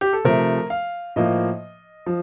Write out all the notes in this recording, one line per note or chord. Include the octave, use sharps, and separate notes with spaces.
G4
A4
C3 F3 A3 A#4
F5
A2 F3 A#3 D#5
F3